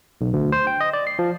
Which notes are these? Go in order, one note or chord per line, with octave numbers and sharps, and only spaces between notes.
B1
D2
C5
G5
D#5
D5
C7
F3